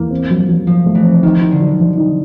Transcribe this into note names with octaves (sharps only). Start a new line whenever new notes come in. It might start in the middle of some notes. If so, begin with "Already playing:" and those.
Already playing: E2 A#3
C4
F#3
F#3
F3 F#3
A3
E3
C4
D#3 D#4
D#4
D3
F#3
F#3
D#4